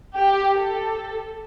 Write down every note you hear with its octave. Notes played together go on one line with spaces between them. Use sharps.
G4
A4